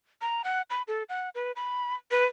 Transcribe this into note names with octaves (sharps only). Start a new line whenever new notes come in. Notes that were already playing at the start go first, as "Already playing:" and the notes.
A#5
F#5
B5
A4
F#5
B4
B5
B4